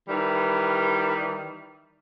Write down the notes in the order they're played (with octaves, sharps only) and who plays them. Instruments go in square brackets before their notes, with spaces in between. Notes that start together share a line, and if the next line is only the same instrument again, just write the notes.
[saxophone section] D#3 E3 G3